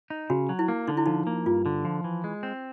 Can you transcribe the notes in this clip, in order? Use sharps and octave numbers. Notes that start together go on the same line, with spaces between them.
D#4
C#3 F#4
F#3
E4
A#3
D3 D#4
E4
F3 D#4
A#3
G2 F4
D3
F3
E3
G#3
C4